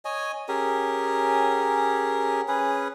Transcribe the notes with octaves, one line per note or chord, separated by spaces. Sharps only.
C#5 D#5 G#5
C#4 G4 G#4 A#4
C#4 G#4 B4